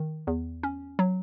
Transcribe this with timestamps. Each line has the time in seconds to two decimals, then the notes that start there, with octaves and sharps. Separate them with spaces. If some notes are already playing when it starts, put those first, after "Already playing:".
Already playing: D#3
0.27 E2
0.63 C#4
0.99 F#3